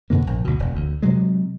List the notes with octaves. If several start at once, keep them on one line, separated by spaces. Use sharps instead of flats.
G#2 B2 D3 A#3
A#1
D2 B2
E1
D2
C3 F#3 G#3